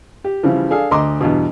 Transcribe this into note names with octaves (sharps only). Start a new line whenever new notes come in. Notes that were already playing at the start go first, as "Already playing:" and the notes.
G4
C#3 E3 F3 G3
D4 G#4 A4 F5
D2 D#5 A#5 C6 D6
E2 G2 B2